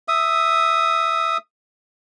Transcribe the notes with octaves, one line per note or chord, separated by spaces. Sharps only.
E5 D#6